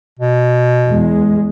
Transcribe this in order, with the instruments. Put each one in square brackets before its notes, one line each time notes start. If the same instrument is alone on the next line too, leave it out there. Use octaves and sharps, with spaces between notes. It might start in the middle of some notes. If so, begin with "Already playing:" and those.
[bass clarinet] B2
[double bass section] E2 G#3